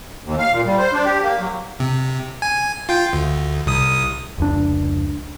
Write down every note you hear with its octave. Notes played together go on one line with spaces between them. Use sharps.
D#2
F5
A#2
G3
C5
D4
G4
A#3
F#3
C3
G#5
F4 G5
D2
C2 D#6
F1 C#2 D4